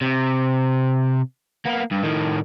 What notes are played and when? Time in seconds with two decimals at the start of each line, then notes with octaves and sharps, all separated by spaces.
0.01 C3
1.65 A#3 B3
1.91 G2
2.03 A2 D#3